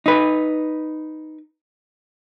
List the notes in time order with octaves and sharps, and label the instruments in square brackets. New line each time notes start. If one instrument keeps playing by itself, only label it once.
[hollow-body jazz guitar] D#4 B4